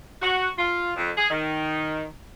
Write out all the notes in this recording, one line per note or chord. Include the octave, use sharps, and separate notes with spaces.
F#4
F4
F2
G#4
D#3